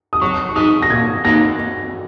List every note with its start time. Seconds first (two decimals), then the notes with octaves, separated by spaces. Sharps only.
0.13 D#6
0.22 F#3 C#6
0.49 C#6
0.56 D#4 G#4 D#6
0.82 A#6
0.90 A#2 G#6
1.25 A#3 D#4 A#6